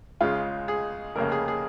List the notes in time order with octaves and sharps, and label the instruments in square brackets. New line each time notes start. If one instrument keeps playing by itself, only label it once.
[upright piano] C#2 C#3 G#3 F4
G#4
F1 F2 C#3 A#3 A#4
G#4
G#4